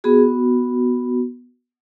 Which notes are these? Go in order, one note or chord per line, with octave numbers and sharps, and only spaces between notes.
B3 F#4 G#4